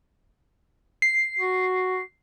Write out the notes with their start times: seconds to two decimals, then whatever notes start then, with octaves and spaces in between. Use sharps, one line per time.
1.02 C7
1.39 F#4